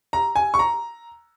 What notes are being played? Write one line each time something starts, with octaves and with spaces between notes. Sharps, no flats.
A#5
G#5
C#6
A#5